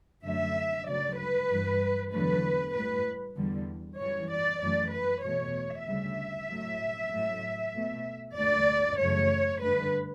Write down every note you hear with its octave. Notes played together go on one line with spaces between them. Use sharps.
F#2 D3 F#3 A3 E5
D2 C#3 F#3 D5
B4
G2 E3 G3
E2 D3 F#3 A3 B4
A2 G3 B4
E2 D3 G3
F#2 E3 G3 C#5
D5
F#2 E3 A3 D5
B4
E2 B2 A3 C#5
D2 C#3 G3 E5
A2 F#3 A3
A2 F#3 A3
B2 A3
D2 D3 A3 D5
F#2 C#3 E3 A3 C#5
G2 D3 A3 B4